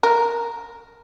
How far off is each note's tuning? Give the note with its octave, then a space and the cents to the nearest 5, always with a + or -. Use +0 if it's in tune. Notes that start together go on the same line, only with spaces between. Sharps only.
A#4 +0